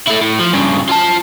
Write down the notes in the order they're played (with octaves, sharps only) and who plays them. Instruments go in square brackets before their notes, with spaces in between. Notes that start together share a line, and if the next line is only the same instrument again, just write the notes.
[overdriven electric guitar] A3 E4
A2
F3
G2 C#3
F4 A5